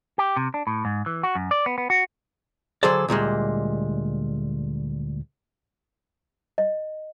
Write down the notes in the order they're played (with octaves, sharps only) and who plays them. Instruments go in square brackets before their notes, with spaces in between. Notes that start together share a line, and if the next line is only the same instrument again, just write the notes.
[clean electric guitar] G4
C3
D4
A2
G#2
E3
F#4
F#2
D5
B3
B3
F#4
[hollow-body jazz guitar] D3 F#3 G#4 A4 C5 D5
D2 A#2 G3 G#3
[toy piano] D#5